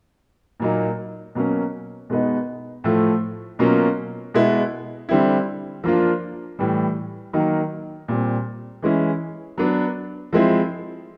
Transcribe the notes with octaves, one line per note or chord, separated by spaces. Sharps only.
A#2 F#3 A#3 D#4
B2 F#3 A#3 C#4
B2 G#3 B3 D#4
A2 F3 A3
B2 F#3 A#3 C#4 F4
B2 G#3 B3 E4
D3 G3 C4 E4
F3 A#3 D4 F4
A2 E3 G3
D#3 F#3 A#3 D#4
A#2 G3 C4
E3 G#3 C#4 E4
F#3 B3 D4
F3 G#3 C4 E4